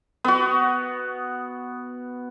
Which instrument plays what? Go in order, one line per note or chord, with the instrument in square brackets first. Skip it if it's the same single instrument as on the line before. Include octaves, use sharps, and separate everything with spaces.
[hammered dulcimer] B3 F#4